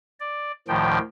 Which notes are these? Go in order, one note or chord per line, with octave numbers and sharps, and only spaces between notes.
D5
D2 A2 D#3 F3 G5